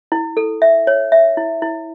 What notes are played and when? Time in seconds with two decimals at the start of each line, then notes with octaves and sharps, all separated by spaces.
0.12 E4
0.37 A4
0.62 E5
0.87 C#5
1.12 E5
1.37 E4
1.62 E4